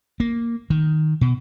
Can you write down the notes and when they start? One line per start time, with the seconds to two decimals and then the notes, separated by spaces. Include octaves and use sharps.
0.20 A#3
0.70 D#3
1.21 B2